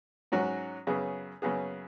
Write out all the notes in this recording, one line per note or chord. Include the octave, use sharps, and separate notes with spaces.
G#2 F#3 C#4 F#4
F#2 C#3 B3 G#4
F#2 C#3 B3 G#4